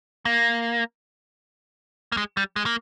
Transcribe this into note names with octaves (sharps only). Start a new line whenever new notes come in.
A#3
A#3
G#3
G3
G#3
A#3